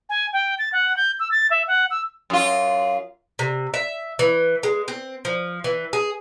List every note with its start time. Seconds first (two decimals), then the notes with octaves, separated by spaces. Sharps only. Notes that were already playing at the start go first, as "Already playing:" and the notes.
0.09 G#5
0.33 G5
0.59 A6
0.73 F#5
0.97 G6
1.19 E6
1.31 A6
1.51 E5
1.68 F#5
1.90 E6
2.30 F#2 F4
3.39 C3
3.74 E5
4.19 E3
4.63 G#3
4.88 C4
5.25 F3
5.64 E3
5.93 G#4